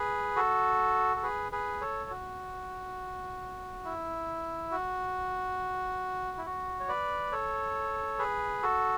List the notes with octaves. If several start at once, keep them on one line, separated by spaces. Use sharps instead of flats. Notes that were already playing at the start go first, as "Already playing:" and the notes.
Already playing: G#4 B4
F#4 A4
A4
G#4 B4
G#4 B4
A4 C#5
F#4
E4
F#4
E4
F#4
C#5
B4 D5
A4 C#5
G#4 B4
F#4 A4